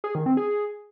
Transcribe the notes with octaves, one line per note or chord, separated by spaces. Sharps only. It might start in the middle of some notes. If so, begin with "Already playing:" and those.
G#4
D#3
C4
G#4